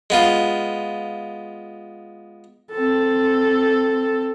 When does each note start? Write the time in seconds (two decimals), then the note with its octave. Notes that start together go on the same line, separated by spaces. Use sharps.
0.10 G#3 B3 F4
2.72 C4 A4